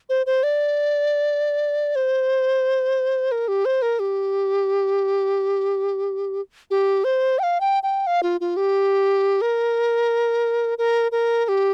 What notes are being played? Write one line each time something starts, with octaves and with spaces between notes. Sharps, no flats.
C5
C5
D5
C5
A#4
G4
C5
A#4
G4
G4
C5
G5
F5
G5
G5
F5
F4
F4
G4
A#4
A#4
A#4
A#4
G4